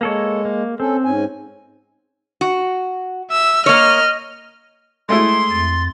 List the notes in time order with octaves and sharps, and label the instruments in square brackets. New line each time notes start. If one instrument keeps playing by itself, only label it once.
[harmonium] G#3 [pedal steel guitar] A#3 A4 C#5
[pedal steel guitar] A#3
[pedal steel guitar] C4 [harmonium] C#4 A4
[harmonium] G#2 C#4 G#5
[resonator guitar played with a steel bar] F#4
[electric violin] E5 [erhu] E6
[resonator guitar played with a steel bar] A#3 C#5 [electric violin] D#5 [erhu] F6
[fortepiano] G#3 A3 E4 [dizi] C6
[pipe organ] F2 A6